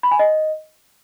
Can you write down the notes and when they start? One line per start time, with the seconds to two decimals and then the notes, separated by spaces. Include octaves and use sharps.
0.03 B5
0.11 G#5
0.19 D#5